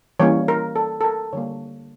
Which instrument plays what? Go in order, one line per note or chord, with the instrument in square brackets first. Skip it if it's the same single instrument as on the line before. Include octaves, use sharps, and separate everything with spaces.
[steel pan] E3 G3 A#3 C#4 C#5
A#4
A4
A4
A#4
D3 G3 A#3 C#5